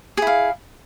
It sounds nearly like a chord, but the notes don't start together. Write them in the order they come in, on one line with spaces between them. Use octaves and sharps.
G#4 E4 F5